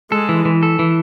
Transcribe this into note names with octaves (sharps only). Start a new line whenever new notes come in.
G#3 A4
E3
E3
A4
E3